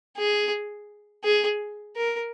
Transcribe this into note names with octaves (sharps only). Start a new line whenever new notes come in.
G#4
G#4
A#4